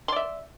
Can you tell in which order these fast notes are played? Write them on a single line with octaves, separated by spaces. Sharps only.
C6 D5 E5